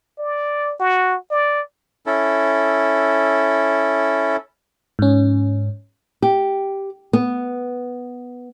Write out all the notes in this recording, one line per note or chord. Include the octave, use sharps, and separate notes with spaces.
D5
F#4
D5
C#4 E4 A4
G#2 C#4
G4
B3